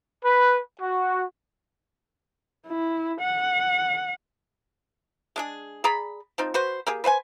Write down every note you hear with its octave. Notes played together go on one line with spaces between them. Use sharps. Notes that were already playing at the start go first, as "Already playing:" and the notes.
B4
F#4
E4
F#5
G#3 D4 G#4
G#4 D5 A#5 B5
F3 C4 D#4
F#4 B4 C5
A#3 G4 G#4
B4 C5 F#5 G#5